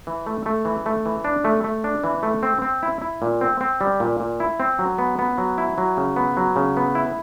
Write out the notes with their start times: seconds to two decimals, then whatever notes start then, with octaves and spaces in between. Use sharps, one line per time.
0.07 E3
0.27 A3
0.46 A3
0.65 E3
0.86 A3
1.06 E3
1.24 D4
1.44 A3
1.64 A3
1.84 D4
2.04 E3
2.23 A3
2.43 C4
2.62 C4
2.83 E4
3.02 E4
3.22 A#2
3.41 C4
3.61 C4
3.81 G3
4.00 A#2
4.20 A#2
4.40 E4
4.60 C4
4.79 F#3
4.98 B3
5.19 B3
5.38 F#3
5.58 E4
5.78 F#3
5.97 C#3
6.16 B3
6.37 F#3
6.56 C#3
6.77 B3
6.95 E4